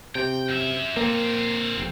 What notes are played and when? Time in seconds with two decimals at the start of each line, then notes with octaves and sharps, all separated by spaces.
0.15 C3 G5
0.49 F#2 E5
0.97 A#2 A#3 C4
1.78 F1